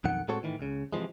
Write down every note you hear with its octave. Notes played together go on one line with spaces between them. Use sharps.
B1 F2 D#3 F#5
A2 G#3 C4 F#4 A4 C#5
A2 D#3 E3
C#2 C#3
C3 E3 F3 G#3